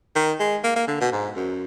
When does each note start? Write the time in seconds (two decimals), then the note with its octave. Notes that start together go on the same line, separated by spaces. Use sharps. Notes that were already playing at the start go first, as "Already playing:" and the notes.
0.16 D#3
0.40 G#3
0.64 A#3
0.76 A#3
0.88 D3
1.00 B2
1.12 G#2
1.36 F#2